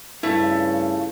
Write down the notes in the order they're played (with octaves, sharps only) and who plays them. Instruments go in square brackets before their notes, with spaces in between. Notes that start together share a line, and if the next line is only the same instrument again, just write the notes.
[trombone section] G2 C#3 F4 [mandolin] A3 [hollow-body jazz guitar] E4